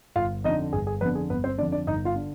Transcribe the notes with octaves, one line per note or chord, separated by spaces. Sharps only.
G1 F4 F5
F2 D3 D#4 D#5
G1 G#4
G#4
F2 D3 B3 B4
G#4
G1 B3 B4
C4 C5
F2 D3 D4 D5
D4 D5
G1 D#4 D#5
F4 F5
D3